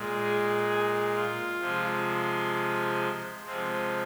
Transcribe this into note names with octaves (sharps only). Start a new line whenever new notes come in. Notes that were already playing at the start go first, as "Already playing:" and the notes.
Already playing: A#2 G#3
G#4
G#4
F4
C3 F3 G#3
C3 F3 G#3 C4